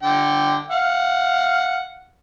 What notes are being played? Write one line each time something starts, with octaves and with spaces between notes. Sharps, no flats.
D3 G5
F5 F#5